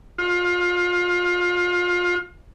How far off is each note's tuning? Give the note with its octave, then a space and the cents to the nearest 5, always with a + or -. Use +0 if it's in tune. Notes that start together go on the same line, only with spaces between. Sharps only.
F4 +25